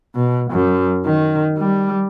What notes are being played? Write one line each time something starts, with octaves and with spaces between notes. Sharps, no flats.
B2
F#2
D#3
G3